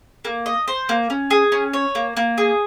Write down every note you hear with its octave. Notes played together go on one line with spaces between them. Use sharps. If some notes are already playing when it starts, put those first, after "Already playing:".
A#3
D#5
C5
A#3
C#4
G#4
C#4
C#5
A#3
A#3
G#4